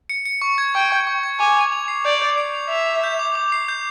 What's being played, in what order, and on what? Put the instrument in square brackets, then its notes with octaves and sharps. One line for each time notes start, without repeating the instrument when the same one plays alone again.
[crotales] C#7
C#7
C#6
G#6
[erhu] G5 [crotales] C#6
[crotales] C#6
C#6
G#6
[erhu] G#5 [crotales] D6
[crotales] F7
F7
C7
[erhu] D5 [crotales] G6
[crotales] G6
C7
F7
[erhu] E5 [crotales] F7
[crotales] F7
G6
D6
D6
C7
G6